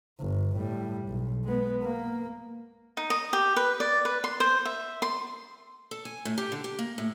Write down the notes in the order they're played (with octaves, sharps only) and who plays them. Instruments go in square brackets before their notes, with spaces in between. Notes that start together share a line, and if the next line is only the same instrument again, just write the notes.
[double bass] G1
A2 G3
B1
G#3 B3
A#3
[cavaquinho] D#4
D#5
G4
B4
D5
B4
C6
C5
E5
C6
[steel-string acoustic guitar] A4
G#5
A2
G4
D3
G4
A#3
A2